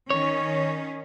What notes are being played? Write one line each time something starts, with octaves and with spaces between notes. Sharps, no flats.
D#3 C#4 C#5